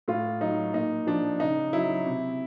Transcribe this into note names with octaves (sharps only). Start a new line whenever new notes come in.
A2 F4
F#3 D#4
A#2 D#4
F3 D4
C#3 D#4
F#3 E4
C3